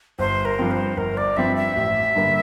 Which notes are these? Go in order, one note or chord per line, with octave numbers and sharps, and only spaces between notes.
G1 C5
A#4
G2 F3 C4
C5
G1 A#4
D5
G2 F3 C4 E5
E5
A1
G2 D3 G3 A#3